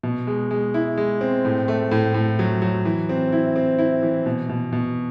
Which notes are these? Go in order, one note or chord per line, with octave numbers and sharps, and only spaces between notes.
B2
G#3
G#3
E4
G#3
C4
A2
A3
A2
A2
F#3
F#3
E3
C4
E4
C4
E4
E3
B2
B2
B2